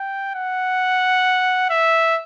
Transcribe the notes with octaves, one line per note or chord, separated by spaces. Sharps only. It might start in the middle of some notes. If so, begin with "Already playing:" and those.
Already playing: G5
F#5
E5